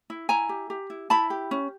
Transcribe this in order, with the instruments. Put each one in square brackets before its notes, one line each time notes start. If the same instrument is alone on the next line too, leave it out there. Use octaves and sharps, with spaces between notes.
[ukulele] E4
E4 G#5 A#5
G4
G4
E4
E4 A5 B5
G4
C#4